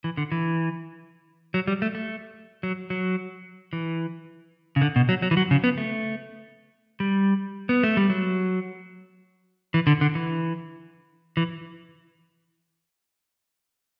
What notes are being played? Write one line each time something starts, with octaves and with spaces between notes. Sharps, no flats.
E3
D3
E3
F#3
G3
A3
A3
F#3
F#3
E3
C#3
D3
B2
F#3
F#3
E3
F#3
C#3
B3
A3
G3
B3
A3
G3
F#3
E3
D3
D3
E3
E3